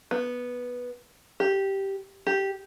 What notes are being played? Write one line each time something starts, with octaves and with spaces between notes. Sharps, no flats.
B3
G4
G4